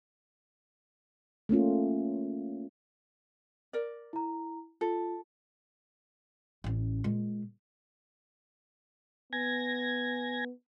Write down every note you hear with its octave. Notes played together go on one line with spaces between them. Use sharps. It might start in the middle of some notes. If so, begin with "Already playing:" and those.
A3 A#3 C#4 F4
A#4 D5
E4 A#5
F4 A4
A1 C#4
A#2 G#3
B3 G#5 G#6 A#6